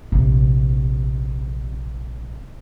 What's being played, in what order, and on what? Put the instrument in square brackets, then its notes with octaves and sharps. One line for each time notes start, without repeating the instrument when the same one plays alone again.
[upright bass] A#1 C3